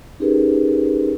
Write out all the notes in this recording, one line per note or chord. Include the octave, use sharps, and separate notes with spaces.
C#4 D#4 G4 G#4 A#4 B4